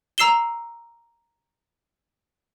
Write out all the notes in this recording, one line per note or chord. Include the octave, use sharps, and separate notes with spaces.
A#5 E6 C7 E7 G7